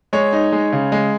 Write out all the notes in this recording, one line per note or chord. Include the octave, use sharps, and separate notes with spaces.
G#3 C#5
D#4
G#3
C#3
G#3